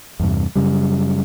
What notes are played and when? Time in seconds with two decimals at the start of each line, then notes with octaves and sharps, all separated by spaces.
0.20 E2 G2 C3
0.56 F#2 C#3 G3